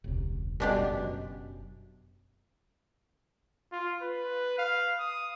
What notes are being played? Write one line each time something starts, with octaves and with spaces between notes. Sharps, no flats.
E1 C#2 C3
F#1 B2 G3 G#3 B3 D4 G4
F#2
F4
B4
F5
D#6